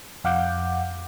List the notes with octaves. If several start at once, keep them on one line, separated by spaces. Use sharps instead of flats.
F2 F5 F#5 D6 G6